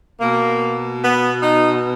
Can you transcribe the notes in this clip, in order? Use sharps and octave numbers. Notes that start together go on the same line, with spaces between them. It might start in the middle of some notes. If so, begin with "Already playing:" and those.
B2 A#3
B3
D#4